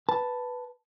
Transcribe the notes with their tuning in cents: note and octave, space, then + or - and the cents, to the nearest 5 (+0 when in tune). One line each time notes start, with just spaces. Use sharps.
B4 +0 A5 +0